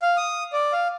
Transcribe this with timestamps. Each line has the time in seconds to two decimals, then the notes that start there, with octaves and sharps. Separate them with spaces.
0.02 F5
0.17 D#6
0.53 D5
0.73 F5